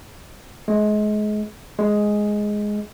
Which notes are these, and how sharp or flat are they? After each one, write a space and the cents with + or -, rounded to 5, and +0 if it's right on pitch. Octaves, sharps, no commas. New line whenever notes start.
G#3 +30
G#3 +5